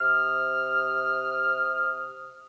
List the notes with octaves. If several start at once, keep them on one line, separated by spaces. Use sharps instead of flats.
C3 D#6 F6